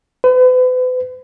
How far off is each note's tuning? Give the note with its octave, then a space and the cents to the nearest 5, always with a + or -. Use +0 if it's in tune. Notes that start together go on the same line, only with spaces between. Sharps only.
B4 +40